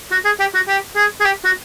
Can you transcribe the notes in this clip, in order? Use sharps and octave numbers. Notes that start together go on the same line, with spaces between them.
F#4
G#4
G4
F#4
G4
G#4
G#4
G4
F#4